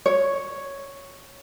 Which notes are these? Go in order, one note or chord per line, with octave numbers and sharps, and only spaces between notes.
C#5